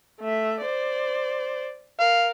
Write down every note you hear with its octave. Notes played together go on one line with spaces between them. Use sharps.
A3 E5
C5 D5
A#4 F5